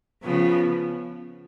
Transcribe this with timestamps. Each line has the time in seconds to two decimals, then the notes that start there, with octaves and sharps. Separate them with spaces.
0.22 C#3 F3 B3